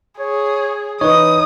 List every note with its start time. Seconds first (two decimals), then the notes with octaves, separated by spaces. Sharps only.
0.19 G#4 C#5
1.01 E3 D#4 B4 C#5 D#6